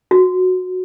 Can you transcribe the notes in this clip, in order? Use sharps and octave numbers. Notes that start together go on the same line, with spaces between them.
F#4